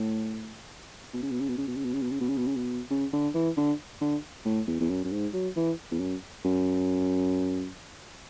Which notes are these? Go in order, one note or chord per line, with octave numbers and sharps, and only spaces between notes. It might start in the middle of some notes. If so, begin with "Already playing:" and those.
Already playing: A2
B2
C#3
B2
C#3
B2
C#3
B2
C#3
B2
C#3
B2
C#3
B2
C#3
B2
C#3
B2
C#3
D3
E3
D3
D3
A2
E2
E2
F#2
F#2
G#2
F#3
E3
E2
F#2
F#2